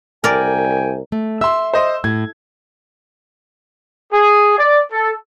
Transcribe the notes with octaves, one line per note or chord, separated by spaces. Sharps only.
C2 A#4 D5 G5 G#5
A3
E5 C6 E6
C5 D#5
A2 G#6
G#4
D5
A4